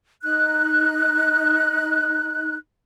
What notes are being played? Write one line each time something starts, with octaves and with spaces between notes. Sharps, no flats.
D#4 F#6